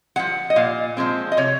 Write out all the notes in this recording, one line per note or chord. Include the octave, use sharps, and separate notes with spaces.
F3 G#3 F#5
D#5
A#2 F5
F3 G#3 C4
D#5
C3 C#5